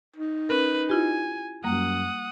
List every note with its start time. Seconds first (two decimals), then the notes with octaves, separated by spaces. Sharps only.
0.16 D#4
0.49 C#4 A#4 B4
0.90 E4 F4 G4 G#5
1.64 F#2 G3 A#3 F#5 D#6